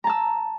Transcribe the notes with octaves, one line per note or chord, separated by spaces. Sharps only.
A5 A#5 E6